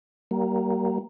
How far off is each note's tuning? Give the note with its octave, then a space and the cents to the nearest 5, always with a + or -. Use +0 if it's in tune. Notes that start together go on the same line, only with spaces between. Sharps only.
G3 -35 A#3 +0